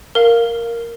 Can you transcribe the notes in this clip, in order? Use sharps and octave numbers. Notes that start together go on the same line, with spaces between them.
A#4 F5